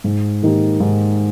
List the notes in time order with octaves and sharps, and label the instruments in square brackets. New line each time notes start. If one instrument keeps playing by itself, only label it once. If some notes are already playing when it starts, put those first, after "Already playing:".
[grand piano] G#2
D#3 A#3 D#4 G4
G#2